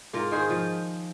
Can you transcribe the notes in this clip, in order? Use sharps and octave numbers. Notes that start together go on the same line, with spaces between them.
G#2 F4 A#4
D#3 G#4 C5
F3